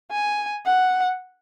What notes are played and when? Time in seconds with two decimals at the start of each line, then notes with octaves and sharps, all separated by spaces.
0.12 G#5
0.66 F#5